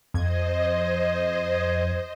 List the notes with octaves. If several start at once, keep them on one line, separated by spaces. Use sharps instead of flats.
F2 C5 D#5 G#6